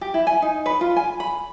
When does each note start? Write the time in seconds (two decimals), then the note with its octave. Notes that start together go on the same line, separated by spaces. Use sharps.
0.01 G4
0.14 E4
0.27 G#5
0.42 D#4
0.66 B4
0.81 F4
0.96 G#5
1.20 B5